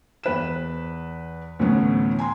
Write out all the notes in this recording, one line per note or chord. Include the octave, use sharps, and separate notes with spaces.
E2 B4 E7
D2 A2 E3 F#3 B3 C#4
G#5 A#5 C6